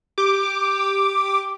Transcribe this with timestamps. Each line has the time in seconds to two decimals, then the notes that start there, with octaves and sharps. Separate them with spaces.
0.18 G4 D6